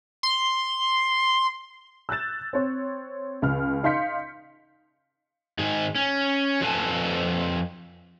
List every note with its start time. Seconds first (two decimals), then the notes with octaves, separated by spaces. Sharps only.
0.23 C6
2.09 E6 F#6 G6 A6 E7
2.53 C4 C#5
3.42 C#2 F6
3.83 D#4 F5 C6 G6 B6 C#7
5.59 G#2 D#3 G#4
5.95 C#4
6.61 F2 F4 A4 B4 G#5 A5